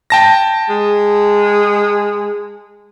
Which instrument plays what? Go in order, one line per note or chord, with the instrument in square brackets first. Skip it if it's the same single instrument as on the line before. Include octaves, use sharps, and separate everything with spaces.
[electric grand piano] G5 A5 A#6
[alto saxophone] G#3